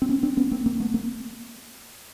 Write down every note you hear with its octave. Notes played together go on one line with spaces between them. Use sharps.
C4
B3 C#4
C4 D4
B3 C#4
A#3 C4
A#3 C4
A3 B3
A#3 C4